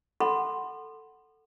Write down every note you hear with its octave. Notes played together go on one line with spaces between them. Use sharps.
A4 F#5 B5 C6